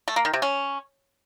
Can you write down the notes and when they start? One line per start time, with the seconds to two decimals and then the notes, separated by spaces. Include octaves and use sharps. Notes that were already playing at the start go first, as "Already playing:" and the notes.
0.08 A3
0.16 A#3
0.25 D#3
0.33 C3
0.42 C#4